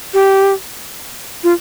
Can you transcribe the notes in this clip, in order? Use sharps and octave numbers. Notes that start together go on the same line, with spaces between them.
G4
F4